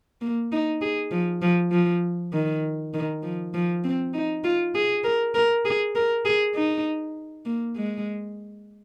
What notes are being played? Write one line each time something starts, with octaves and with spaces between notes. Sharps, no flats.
A#3
D#4
G#4
F3
F3
F3
D#3
D#3
F3
F3
C4
D#4
F4
G#4
A#4
A#4
G#4
A#4
G#4
D#4
A#3
G#3